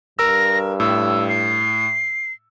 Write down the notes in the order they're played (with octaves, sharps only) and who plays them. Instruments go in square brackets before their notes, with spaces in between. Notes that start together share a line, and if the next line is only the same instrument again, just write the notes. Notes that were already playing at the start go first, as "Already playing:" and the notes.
[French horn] G2 [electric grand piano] A#4 E6 [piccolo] A#6
[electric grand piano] A2 [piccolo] E6
[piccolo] C7